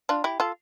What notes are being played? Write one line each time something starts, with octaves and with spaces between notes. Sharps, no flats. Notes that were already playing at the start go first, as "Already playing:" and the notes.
D4 F4
E4 G4
F4 A4